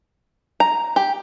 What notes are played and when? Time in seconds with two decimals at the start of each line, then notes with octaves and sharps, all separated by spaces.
0.60 A#5
0.96 G4